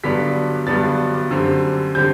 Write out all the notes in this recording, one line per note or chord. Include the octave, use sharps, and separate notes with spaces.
G2 D3 F#3 B3 D4 B6
G2 D3 F#3 B3 D4 A6
F#2 D3 G3 C4
D3 G3 C4 G6